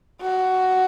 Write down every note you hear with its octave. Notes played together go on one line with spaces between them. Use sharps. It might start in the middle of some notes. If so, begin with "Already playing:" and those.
F#4